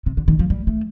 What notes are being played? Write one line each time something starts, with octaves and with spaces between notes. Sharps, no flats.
C3
D3
D#3
F3
G3
A3